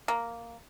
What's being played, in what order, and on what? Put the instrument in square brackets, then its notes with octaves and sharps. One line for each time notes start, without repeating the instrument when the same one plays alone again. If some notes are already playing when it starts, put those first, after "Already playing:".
[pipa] A#3